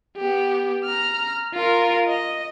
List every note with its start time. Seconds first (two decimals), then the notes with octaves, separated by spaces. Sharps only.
0.17 B3 G4
0.85 A#5 F6
1.54 F4 A#4
2.08 D#5